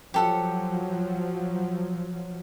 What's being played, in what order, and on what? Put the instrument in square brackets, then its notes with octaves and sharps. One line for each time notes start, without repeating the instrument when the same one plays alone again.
[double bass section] F3 F#3 [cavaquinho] G4 A4 F#5